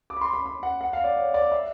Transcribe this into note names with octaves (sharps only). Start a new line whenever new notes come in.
D6
B5
C6
B5
B5
F#5
F#5
F5
D5
C#5
D5
E5